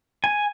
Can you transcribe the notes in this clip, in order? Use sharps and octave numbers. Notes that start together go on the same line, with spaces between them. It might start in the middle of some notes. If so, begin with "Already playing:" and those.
G#5